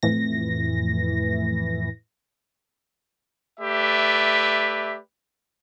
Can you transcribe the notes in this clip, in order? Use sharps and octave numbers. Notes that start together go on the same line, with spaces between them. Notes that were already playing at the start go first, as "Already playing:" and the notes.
F2 A2 E3 A#6
A3 G4 B4 D5 E5